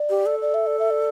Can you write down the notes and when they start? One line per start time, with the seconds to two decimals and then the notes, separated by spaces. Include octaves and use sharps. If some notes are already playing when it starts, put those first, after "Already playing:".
Already playing: D5
0.10 G4
0.26 A4
0.42 D5
0.54 E5
0.67 D5
0.79 E5
0.90 D5